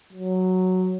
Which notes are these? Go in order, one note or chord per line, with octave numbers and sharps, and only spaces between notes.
F#3